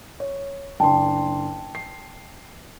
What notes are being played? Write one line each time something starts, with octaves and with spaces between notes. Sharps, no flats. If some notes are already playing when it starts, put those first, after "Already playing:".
C#5
F#1 D4 G5 A5 C6
C7